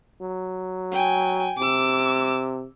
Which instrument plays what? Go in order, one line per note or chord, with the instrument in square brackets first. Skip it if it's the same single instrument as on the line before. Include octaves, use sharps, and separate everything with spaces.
[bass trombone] F#3
[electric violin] G5 G#5
[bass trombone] C3 [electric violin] D6 E6